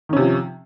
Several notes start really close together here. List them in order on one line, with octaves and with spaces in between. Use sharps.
D#3 C#4 C3 F3